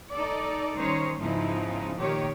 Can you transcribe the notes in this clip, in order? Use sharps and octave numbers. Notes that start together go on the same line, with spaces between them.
D#4 A4 D5
D#3 G3 C#4 D#4 C5 C#5
G#2 C#3 F3 B3 D#4 E4
A#2 D#3 G4 C#5